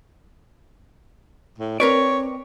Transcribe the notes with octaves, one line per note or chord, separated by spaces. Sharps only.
A2
C4 A#4 B4 C#5 D5